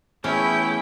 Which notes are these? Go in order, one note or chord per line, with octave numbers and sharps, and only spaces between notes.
E3 A3 B3 C#4 E4 G#4 C#5 G5